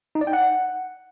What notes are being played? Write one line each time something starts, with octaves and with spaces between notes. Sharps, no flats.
D#4
D5
G5
F#5